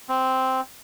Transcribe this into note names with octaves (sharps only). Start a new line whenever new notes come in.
C4